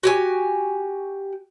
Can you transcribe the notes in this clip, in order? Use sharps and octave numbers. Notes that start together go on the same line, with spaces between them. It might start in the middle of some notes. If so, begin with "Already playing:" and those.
F#4 G4 G#5